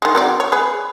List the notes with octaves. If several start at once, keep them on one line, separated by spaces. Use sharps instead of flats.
D#3 G#3
F#3 C4 D5
C#5
G#4 B4